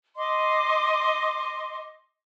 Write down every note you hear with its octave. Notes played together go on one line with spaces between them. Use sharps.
D#5 C6 D6